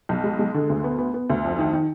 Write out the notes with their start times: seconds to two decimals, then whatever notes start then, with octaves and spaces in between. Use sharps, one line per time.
0.09 B1
0.24 G#3
0.39 G#3
0.54 D3
0.70 D2
0.84 B3
0.99 B3
1.14 B3
1.30 D2
1.45 F2
1.59 D#3
1.73 D#3